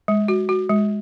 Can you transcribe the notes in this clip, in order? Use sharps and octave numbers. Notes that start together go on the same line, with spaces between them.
G#3
F#4
F#4
G#3